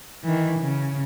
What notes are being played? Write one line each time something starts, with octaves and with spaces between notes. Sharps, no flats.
D#3 E3
C#3